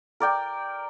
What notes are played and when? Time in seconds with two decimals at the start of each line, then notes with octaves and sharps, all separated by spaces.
0.20 A#4 D5 G5